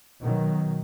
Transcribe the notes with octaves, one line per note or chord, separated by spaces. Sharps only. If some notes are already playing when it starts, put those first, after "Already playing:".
B2 D#3 F#3